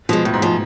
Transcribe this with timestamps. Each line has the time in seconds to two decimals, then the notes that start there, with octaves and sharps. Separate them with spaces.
0.09 B2 F3 G#3
0.25 F2 A2
0.34 G#2
0.42 F3 G#3